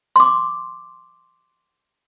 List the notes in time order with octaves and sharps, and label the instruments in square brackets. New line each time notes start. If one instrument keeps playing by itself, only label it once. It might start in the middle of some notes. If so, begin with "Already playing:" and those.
[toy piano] C6 D6